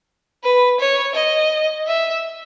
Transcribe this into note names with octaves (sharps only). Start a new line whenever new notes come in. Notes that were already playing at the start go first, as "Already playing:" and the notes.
B4
C#5
D#5
E5